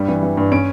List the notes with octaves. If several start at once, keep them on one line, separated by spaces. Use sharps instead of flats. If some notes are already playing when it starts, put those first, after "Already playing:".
Already playing: G2 G3
E3
E3
G2
C#4 D7